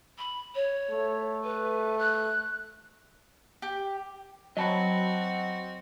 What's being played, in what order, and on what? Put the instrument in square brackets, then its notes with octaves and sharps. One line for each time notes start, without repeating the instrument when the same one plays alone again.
[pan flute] B5
C#5
[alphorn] A3
[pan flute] B4
F#6
[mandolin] G4
[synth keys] F#3 [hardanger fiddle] C4 F#4 [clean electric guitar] D#5 A5 B5